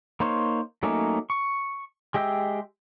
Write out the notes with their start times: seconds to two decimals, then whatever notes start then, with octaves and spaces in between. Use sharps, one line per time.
0.20 A#3 D#4 C5 C#5
0.83 F#3 A3 A#3 C#4 D#4
1.30 C#6
2.14 G#3 G4 D#5 E5 G5